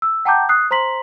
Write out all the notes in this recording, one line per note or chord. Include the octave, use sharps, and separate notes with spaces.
E6
F#5 G5 A5 A#5 D6 G6
D#6 F#6 C7
C5 A#5 C6 B6 F#7